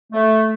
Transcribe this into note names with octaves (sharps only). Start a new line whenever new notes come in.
A3